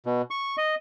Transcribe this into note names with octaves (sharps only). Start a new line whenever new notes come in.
B2
C#6
D#5